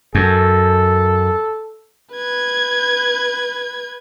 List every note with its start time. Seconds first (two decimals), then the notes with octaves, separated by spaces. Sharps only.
0.15 F#2 A4
2.13 B4 G#6